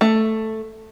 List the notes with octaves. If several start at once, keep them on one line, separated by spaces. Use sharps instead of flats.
A3